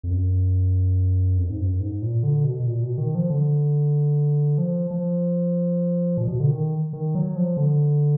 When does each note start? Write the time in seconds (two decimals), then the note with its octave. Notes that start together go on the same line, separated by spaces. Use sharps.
0.03 F2
0.11 F#2
1.38 F2
1.50 G#2
1.60 F#2
1.80 G#2
2.02 A#2
2.23 D3
2.44 B2
2.60 B2
2.66 A#2
2.83 B2
2.98 D#3
3.15 F3
3.30 D3
4.58 F3
4.91 F3
6.17 A#2
6.28 B2
6.40 D3
6.51 D#3
6.93 D#3
7.15 F#3
7.36 F3
7.57 D3